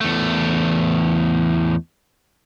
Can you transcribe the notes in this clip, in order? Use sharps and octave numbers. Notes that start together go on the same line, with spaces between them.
E2 A3